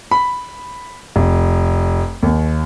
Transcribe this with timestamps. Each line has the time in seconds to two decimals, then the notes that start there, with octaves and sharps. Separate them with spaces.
0.11 B5
1.16 F1
2.23 D#2